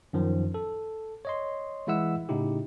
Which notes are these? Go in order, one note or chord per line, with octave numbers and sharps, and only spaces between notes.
F#2 D#3 F3
A4
C#5 D#5 C6
E3 G#3 E4 E5 F#5 E6
A2 C#3 D#4 E4 G4